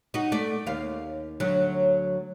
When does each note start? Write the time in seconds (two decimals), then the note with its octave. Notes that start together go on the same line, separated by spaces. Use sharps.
0.14 D#4 F#4
0.32 A3 D5
0.67 D#2 F5
1.40 D2 F#3